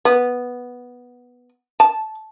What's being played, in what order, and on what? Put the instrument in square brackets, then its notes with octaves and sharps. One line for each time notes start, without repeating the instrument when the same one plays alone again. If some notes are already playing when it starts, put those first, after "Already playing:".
[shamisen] B3
A5